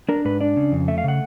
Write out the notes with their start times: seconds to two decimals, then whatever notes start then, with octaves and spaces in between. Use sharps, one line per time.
0.09 D4 A#4
0.25 G#2 B4
0.41 D4 D5
0.57 C#3
0.72 F2
0.88 A3 E5
0.98 F5
1.04 C#3 F#5